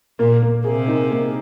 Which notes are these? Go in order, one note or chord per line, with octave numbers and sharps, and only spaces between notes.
A#2 A#3
A#3
C3 G#4
D#4
A#3